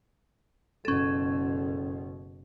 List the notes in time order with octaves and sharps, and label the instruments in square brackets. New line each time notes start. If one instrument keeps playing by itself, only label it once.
[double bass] F#1 B2 [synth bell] C#4 A4